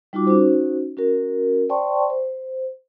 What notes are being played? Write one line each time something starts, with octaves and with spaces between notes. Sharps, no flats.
G3 D#4 F4 F#4 D6
C#4 D#4 F#4 C5
C#4 F#4 A#4
C5 D5 G5 A5 C6 C#6
C5